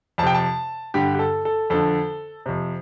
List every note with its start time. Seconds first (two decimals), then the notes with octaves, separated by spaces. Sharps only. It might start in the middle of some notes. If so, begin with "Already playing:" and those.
0.18 F2 A5
0.22 C3 G5
0.35 A5
0.94 G2 D3 G4
1.15 G4
1.19 A4
1.45 A4
1.70 F2 D3 A4
2.46 F2 C3